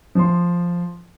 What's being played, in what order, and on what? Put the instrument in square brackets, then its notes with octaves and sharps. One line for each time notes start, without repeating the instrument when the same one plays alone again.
[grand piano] F3 C6